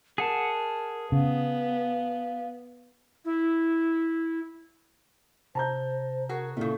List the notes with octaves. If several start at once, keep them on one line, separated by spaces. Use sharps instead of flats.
G#4 A#4 F#5 A5
C#3 B3 F5
E4
C3 C5 A5 A#5 G6
F#4 G#4 A#4
A#2 C#3 A3 E4 A4